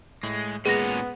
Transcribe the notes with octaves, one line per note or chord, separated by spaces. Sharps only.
A2 G#3
A#2 G#3 B3 C#4 G#4 A#6